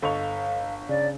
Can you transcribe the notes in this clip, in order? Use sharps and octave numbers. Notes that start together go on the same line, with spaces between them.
G1 A4 D#5 F5 C#6 F7
C#3 D5